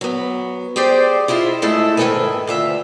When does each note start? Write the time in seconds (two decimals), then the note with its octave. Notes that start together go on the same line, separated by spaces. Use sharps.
0.01 F#3 B3
0.76 G4 G#4 C5 D5 G5
1.28 E4 F4 G#4 D#5
1.62 G#3 A3 E4 G#4 A4
1.97 G#2 D#3 G3 A4 B4 G#5
2.47 D2 F4 E5